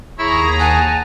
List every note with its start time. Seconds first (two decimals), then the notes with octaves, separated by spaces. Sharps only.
0.19 D#2 E4 G#4 C#5 A#5
0.60 F#5 G#5 A5